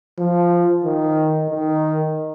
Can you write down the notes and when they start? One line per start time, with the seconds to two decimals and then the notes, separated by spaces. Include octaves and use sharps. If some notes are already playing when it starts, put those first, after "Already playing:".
0.19 F3
0.84 D#3
1.49 D#3